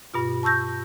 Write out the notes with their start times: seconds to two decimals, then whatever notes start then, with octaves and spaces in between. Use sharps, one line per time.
0.14 G2 B2 F4
0.43 A5 C#6 E6 G6 A#6